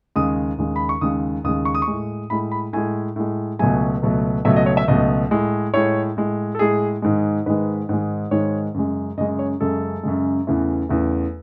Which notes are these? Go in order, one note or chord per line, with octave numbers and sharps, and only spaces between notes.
D#2 C#3 G#3 D#6
D#2 C#3 G#3
B5
C#6
D#2 C#3 G#3 D#6
D#2 C#3 G#3 D#6
C#6
D#6
C#6
A2 G#3
A2 G#3 B5
B5
A2 G#3 G#5
A2 G#3
C#2 B2 F#3 A3 G#5
C#2 B2 F#3 A3
C#2 B2 F#3 A3 E5
D#5
C#5
E5
C#2 B2 F#3 A3 D#5
A2 G#3
A2 G#3 C#5
A2 G#3
A4
A2 G#3 G#4
G#2 D#3 G#3
G#2 D#3 G#3 B4
G#2 D#3 G#3
G#2 D#3 G#3 C#5
F#2 C#3 G#3
F#2 C#3 G#3 D#5
C#5
F#2 C#3 G#3 A4
F#2 C#3 G#3
E2 C#3 E3 A3
E2 C#3 E3 A3